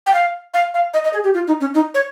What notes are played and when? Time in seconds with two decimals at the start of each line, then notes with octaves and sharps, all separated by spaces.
0.06 G5
0.13 F5
0.54 F5
0.74 F5
0.94 D#5
1.04 D#5
1.13 G#4
1.24 G4
1.34 F4
1.48 D#4
1.61 C#4
1.75 D#4
1.94 C#5